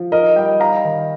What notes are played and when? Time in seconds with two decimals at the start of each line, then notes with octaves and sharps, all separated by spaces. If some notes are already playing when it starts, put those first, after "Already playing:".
Already playing: F3
0.12 D#4 A#4 D#5
0.36 G3 D#5 G5
0.60 D#4 F5 A#5
0.84 D#3